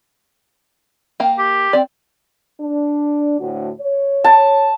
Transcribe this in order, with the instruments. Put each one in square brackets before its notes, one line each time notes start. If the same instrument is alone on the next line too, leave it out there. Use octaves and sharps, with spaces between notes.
[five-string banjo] A#3 F5 G5
[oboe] G4
[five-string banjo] C4 D5
[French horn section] D4
D2 A2 F#4
C#5
[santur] A5